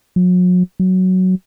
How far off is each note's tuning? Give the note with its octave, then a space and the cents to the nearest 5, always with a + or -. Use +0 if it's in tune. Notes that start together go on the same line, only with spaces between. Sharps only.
F#3 -40
F#3 +5